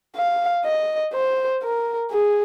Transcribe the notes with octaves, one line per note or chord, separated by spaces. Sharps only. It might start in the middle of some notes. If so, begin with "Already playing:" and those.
F5
D#5
C5
A#4
G#4